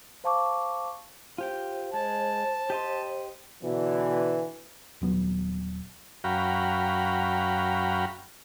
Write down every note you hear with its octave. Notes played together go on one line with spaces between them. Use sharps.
C5 F5 A5 C#6 D6
F4 G4 C5 G5
G#3 A5
G4 D#5 C6
B2 D3 E3
D#1 F#3 B3
F#2 F#4 F5 G5 A#5 B5